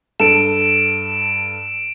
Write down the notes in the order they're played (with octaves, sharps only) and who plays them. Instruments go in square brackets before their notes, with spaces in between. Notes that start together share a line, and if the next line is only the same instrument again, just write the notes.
[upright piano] G2 A4 [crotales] D7 E7